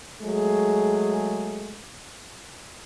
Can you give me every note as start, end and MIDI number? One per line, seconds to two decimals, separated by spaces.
0.22 1.80 54
0.22 1.80 56
0.22 1.80 57
0.22 1.80 68